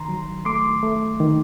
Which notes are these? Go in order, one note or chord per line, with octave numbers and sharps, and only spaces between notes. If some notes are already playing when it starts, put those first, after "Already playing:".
Already playing: D#3 A#5 C6
F#3
A3 C6 D6
A3
D#3